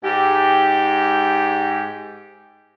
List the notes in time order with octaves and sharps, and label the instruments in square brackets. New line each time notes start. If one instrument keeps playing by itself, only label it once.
[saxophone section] G#2 G4